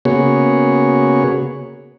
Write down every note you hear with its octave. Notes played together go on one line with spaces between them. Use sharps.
C#3 A#3 B3 F#4 G#4 C#5